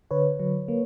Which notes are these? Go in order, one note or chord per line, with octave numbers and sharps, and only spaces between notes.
D3 B4 C#5
F#3
A#3